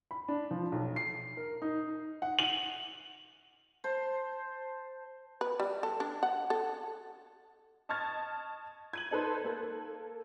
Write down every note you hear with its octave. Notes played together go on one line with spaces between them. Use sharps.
B5
D4
F3
B1
C7
A#4
D#4
F#5
F#7
C5 A5
B4
G3
A4
D4
F#5
A4
D#5 A5 C#6 F6 G#6 A6
G#6 D#7 F#7
D#4 A4 B4 C5
A#3 A4